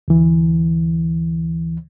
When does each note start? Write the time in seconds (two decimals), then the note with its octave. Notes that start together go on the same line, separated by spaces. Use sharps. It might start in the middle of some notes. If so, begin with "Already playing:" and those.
0.08 D2 E3